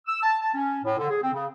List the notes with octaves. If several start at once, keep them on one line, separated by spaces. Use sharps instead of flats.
E6
A5
A5
C#4
A2
D3
G#4
C4
C#3